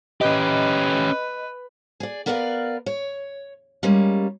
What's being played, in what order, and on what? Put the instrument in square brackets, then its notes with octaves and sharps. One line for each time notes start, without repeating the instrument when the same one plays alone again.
[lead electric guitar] C#4 G4 [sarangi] B4 [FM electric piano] D#5
[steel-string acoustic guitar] G#4 D5
B3 A#4 B4 D5 D#5 F5
C#5
G3 G#3 A#3 C#4